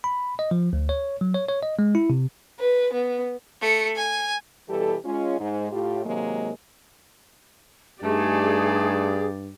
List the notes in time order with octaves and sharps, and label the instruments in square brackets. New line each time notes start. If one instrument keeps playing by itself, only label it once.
[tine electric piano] B5
D#5
F3
D2
C#5
F#3
C#5
C#5
D#5
G#3
E4
C3
[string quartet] B4
B3
[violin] A3 C#7
G#5
[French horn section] B2 E3 G3 G4 A4
G#3 C#4 F4
G#2
A2 F4 G4
C3 D#3 F#3 G#3 A#3
[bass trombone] G2 [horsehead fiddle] A3 D#4 [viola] G4 D5 [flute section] G#4